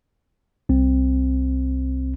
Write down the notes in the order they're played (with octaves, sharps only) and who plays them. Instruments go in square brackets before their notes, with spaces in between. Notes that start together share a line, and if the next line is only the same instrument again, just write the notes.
[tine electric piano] C2 C4